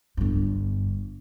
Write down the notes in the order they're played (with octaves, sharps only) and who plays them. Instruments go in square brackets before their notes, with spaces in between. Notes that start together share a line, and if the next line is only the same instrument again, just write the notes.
[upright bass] G1 G2